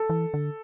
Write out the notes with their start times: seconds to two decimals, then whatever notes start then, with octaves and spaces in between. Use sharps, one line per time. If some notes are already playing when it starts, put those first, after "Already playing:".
Already playing: A4
0.10 E3
0.34 D3